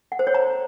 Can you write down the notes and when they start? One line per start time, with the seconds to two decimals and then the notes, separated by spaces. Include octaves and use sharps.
0.12 F#5
0.19 C5
0.27 C#5
0.34 A#5